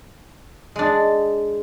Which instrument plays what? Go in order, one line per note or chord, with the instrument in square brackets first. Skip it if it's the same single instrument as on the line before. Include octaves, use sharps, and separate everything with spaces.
[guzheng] G#3 D4